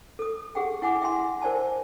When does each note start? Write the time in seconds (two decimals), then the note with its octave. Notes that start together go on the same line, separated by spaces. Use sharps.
0.19 A4 D#6
0.55 G4 G#4 F#5 G5
0.82 E4 F#5 G#5 D6
1.02 E5 G5 G#5 C6
1.42 A#4 C5 D5 G#5 A5